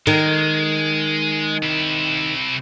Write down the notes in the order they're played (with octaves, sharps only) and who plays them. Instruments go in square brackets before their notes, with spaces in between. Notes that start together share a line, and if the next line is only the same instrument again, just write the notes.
[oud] D#3 [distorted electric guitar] G#3
[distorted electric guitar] C3 E4